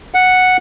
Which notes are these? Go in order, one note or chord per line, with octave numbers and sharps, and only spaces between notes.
F#5